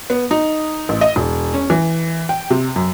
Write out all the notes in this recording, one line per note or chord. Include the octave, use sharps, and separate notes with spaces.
B3
D#4
A1
D#5
E1
C#4
E3
G5
C3
F#2